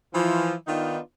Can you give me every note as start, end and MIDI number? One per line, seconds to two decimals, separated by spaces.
0.14 0.54 52
0.14 0.54 53
0.67 0.98 51
0.67 0.98 59
0.67 0.98 62
0.67 0.98 63
0.67 0.98 65